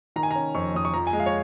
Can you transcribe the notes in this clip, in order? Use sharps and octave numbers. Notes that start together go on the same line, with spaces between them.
D#3 A#5
G#5
C#4 A#5
F2 C#6
F2 D#6
C#6
F3 A#5
G#5
G#3
F5
C#5